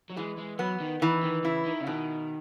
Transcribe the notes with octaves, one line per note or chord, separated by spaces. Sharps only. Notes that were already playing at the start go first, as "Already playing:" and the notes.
F#3
E3 G#3
G#3
F#3 B3
D#3
D#3 E3
D#3
C#3 E4
D#3
C#3
B2 D#3